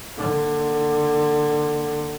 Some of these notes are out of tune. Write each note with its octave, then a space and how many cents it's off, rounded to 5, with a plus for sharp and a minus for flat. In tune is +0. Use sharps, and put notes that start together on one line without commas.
D3 +20 A#3 +0